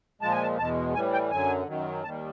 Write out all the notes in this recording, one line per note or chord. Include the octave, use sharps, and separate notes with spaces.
A#2 F3 G#3 A5
G#5
A5
E2 B2 G#3 A5
A2 E3 G3 G#5
G5
F#2 D3 F#3 G#5
F#2 D#3 F#3
D#2 D#3 G3 A5